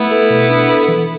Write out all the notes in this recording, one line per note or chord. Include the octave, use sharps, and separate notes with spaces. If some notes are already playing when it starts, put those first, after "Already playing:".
Already playing: A3 B3 E4
A4
B2
D4
A4
E3